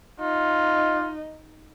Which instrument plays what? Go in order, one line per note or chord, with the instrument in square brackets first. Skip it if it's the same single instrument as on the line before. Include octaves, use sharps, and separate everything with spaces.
[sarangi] D#4 [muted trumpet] F4